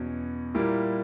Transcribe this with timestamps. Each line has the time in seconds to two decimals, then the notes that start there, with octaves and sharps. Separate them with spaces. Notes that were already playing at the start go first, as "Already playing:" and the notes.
Already playing: E2 B2 F#3 C#4
0.55 A#2 G3 A#3 E4